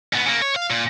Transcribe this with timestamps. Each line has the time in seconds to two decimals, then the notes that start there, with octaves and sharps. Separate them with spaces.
0.13 G#2 B3
0.26 C#3 A#3
0.42 C#5
0.56 F5
0.70 A#2